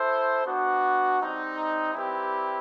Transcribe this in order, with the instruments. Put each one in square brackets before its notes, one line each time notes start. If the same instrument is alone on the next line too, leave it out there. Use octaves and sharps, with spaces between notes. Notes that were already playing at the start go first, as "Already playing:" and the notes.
Already playing: [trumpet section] E4 A4 C5
B3 D4 F#4
G3 C4 D#4
G3 C4 E4 G4 B4